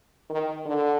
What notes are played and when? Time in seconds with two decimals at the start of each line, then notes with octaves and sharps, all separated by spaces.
0.30 D#3
0.66 D3